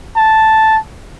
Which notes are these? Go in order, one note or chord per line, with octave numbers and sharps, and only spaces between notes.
A5